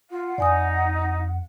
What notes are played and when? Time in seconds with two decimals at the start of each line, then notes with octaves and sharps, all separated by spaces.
0.10 F4 F#5
0.38 F2 D#4 D5 G#5 D#6